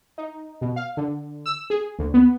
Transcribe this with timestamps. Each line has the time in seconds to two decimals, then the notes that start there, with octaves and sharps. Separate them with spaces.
0.18 D#4
0.61 B2
0.76 F5
0.97 D3
1.46 E6
1.70 G#4
1.99 D2
2.14 B3